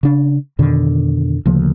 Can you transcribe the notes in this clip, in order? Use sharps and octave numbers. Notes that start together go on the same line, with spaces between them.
C#3 D4
F2 B2 D3 D#3
D2 C#3 F3 A#3